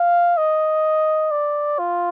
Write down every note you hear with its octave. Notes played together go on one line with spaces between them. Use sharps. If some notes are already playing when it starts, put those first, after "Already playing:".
Already playing: F5
D#5
D5
F4